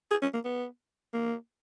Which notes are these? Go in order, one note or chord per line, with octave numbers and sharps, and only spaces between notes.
G#4
C#4
A#3
B3
A#3